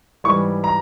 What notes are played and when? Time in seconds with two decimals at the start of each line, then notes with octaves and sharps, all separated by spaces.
0.24 G#2 E3 G3 C#6
0.64 A#5